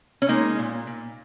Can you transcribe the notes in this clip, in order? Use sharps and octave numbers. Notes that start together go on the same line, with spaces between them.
C#4
G#3 A#3 D#4
A#2
A#2